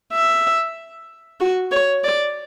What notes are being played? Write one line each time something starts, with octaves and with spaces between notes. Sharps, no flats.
E5
F#4
C#5
D5